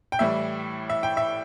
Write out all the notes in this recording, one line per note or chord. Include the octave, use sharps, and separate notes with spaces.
G5
A2 E3 G3 E5
E5
G5
E5